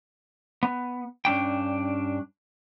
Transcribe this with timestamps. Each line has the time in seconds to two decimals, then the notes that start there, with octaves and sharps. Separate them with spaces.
0.63 B3
1.25 G2 C#4 D4 G5